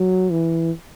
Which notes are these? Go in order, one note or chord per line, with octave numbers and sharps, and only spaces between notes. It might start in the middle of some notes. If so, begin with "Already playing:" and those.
Already playing: F#3
E3